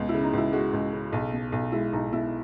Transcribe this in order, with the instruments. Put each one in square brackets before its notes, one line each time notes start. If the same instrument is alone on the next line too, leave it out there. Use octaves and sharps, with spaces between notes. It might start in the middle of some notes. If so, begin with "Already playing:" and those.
Already playing: [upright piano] C#2 B2
E4
C#3
D#4
C#2 E4
G#3 F#4
C#2
C#3
B1
B2
B1
G#3 E4
B1 D#4
B2 E4